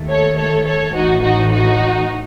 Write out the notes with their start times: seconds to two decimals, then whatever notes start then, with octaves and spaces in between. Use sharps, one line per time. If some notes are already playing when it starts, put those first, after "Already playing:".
Already playing: D#2 D#3 A3
0.10 A4 C#5
0.38 A4 C#5
0.67 A4 C#5
0.95 A1 A2 E3 D#4 F#4
1.23 D#4 F#4
1.52 D#4 F#4